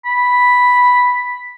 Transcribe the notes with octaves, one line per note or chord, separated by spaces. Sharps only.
B5